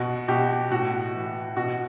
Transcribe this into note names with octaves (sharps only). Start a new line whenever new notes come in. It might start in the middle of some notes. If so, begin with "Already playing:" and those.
Already playing: B2 F#4
B2 G4
A2 F#4
E3
B2 F#4